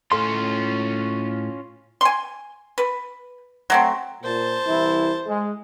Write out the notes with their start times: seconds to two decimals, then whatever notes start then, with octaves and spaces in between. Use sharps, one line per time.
0.12 A2 C#4 F4 A4 C6
2.01 G#5 C6
2.78 B4
3.70 F#3 A3 C4
4.23 A#2 C5 A5
4.66 C2 E3 E4
5.27 G#3